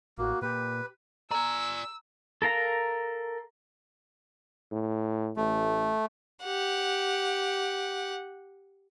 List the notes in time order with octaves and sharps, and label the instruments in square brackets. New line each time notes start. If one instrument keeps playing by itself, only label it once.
[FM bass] A1 [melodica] A#3 [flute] F#4
[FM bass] A#2 [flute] G4 [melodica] B4
[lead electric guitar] D5 G#5 [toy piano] A#5 [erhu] E6
[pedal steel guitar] A4 A#4 F5 A#5
[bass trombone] A2
[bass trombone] A1 [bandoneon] A3
[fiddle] G4 F#5